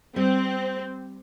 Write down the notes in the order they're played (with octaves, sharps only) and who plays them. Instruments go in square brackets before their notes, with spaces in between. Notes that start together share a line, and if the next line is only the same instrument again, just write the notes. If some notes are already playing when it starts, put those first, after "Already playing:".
[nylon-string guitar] G3 [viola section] C4